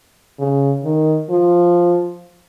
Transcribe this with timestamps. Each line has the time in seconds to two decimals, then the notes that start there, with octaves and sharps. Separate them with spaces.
0.39 C#3
0.84 D#3
1.30 F3